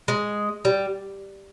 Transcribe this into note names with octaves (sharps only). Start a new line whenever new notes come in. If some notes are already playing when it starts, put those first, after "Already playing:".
G#3
G3